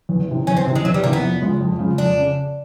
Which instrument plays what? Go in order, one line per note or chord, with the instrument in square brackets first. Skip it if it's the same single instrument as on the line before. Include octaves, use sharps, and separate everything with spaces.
[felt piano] E2
C3 E3
[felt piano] E2 [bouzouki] C#4
[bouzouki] C4
[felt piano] C3 E3
[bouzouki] G#3
[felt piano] E2 [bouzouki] F#3
[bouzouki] G3
[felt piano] C3 E3 [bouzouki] A#3
[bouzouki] B3
[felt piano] F2
C#3 F3 G#3
F2
C#3 F3 G#3
[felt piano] F2 [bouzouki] D4
[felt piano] C#3